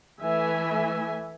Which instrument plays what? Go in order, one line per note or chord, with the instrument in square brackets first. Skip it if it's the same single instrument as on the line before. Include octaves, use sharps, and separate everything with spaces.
[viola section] E3 A3 E5 G#5